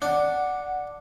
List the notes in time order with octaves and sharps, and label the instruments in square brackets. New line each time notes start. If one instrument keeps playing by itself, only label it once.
[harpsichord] D4 [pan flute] F#5